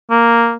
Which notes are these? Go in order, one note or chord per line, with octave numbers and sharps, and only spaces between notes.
A#3